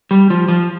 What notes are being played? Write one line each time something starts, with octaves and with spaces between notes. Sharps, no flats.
G3
F3
F3